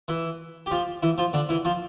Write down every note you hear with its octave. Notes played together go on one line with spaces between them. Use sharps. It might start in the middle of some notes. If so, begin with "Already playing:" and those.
E3 E4
G4
F3 F4
E3 E4
F3 F4
D3 D4
E3 E4
F3 F4